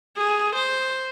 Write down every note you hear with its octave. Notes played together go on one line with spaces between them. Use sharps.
G#4
C5